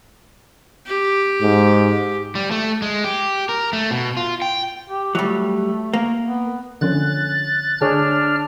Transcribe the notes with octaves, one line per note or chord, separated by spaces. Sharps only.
G4
G#2
G3
A3
G#3
G4
A#4
A3
B2
F4
G5
G4
F#3 G3 A3
A#3
B3
D3 F3 C#4 F#6 A6
D3 D4 G#4 C#5 F6